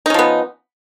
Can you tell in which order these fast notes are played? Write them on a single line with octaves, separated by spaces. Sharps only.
D#4 C#4 F3 B3